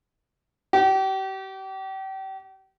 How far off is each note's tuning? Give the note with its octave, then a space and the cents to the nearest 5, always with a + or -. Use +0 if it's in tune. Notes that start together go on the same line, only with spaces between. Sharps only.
G4 -35